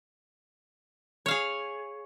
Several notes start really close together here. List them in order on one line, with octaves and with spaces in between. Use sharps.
C#5 F5 G#4